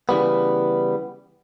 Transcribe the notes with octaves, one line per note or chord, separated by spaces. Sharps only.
C#3 E3 G3 B3